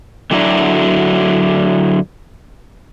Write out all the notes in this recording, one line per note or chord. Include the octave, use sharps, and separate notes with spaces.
D3 F#3 D4 E4 F#4